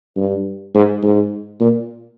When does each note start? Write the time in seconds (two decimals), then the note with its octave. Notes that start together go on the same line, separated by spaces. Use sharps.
0.17 G2
0.75 G#2
1.03 G#2
1.60 A#2